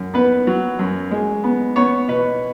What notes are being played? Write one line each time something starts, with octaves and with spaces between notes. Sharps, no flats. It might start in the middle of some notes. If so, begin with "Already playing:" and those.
Already playing: F#2
B3 B4
F#3
F#2
G#3
B3
B3 C#5
B2 B4